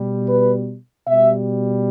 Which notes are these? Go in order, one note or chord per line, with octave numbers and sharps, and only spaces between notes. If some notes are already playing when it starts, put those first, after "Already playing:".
Already playing: B2 G3
B4
B2 G3 E5